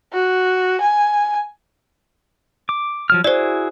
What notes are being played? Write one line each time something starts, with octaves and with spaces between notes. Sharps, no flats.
F#4
G#5
D6
F3 F#3 F6
E4 F#4 G#4 C5 D5